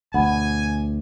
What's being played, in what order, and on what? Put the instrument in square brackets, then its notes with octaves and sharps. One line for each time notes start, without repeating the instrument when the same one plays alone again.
[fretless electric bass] D2 B2 [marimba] F#5 B5 [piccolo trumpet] G#5